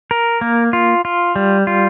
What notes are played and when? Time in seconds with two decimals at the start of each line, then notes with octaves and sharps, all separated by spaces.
0.11 A#4
0.41 A#3
0.73 F4
1.05 F4
1.36 G3
1.67 F4